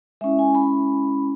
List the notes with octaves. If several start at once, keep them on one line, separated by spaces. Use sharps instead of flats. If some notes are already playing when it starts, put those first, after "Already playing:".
G#3 C#4 E4 E5
G#5
B5